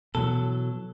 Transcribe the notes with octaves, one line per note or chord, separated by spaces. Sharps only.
B2 E3 F#3 A4